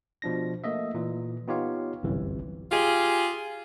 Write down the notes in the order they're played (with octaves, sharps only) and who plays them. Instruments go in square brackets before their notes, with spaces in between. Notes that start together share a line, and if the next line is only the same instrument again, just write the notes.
[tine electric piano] B2 F3 D4 A#6
A3 A#3 D#5 E5
A#2 E3
B3 D#4 F4 G4 C#5 F5
G1 C2 F#2 C3 E3
[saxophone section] F4 G4 G#4